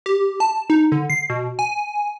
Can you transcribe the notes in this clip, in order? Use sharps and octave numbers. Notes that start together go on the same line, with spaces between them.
G4
A5
D#4
D3
C7
B2
G#5